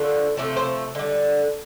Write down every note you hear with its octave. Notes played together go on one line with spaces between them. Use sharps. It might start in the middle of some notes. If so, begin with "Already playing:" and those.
Already playing: D3 F3 A3
C3 F3 A3 A4
C5
D3 G3